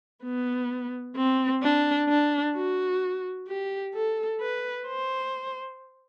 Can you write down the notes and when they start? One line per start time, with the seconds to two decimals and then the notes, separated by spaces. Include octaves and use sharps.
0.24 B3
1.17 C4
1.63 D4
2.09 D4
2.55 F#4
3.48 G4
3.94 A4
4.40 B4
4.87 C5